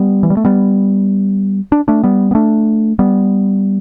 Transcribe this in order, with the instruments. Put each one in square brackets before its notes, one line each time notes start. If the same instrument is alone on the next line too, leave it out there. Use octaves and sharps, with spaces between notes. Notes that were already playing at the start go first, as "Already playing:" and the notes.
Already playing: [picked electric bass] G3 B3
E3
G3
A3
G3 B3
D4
A3 D4
G3 B3
B3
A3 D4
G3 B3